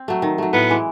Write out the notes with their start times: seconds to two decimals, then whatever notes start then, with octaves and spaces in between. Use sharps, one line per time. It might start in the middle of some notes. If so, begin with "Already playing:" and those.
Already playing: C4
0.08 F#3 A3
0.22 D#3
0.38 F#3 A3
0.53 A2 B3
0.70 E3 G#3